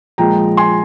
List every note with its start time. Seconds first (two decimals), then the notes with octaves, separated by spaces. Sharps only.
0.18 A#2 F3 G#3 G5 A#5
0.57 G#5 C6